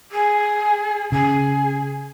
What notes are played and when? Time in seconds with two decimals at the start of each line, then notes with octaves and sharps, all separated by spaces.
0.11 G#4
1.12 C#3 G#4